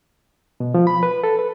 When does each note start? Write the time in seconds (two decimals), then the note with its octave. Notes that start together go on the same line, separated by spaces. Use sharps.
0.60 B2
0.74 F3
0.87 B5
1.03 B4
1.24 A4
1.39 B4